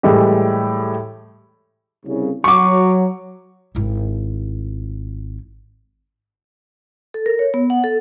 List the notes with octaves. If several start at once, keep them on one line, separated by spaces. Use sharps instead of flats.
A2 E3 G3 G#3 G4
C2 C#3
F#3 C#6 D6
G#1 E4
A4
A#4
C#5
B3
F#5
A4